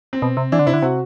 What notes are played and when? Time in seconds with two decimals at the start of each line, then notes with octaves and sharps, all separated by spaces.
0.13 C4
0.22 B2
0.37 C3
0.52 E3 D4
0.59 D3
0.66 C3 E4
0.73 D3
0.82 C3 F#4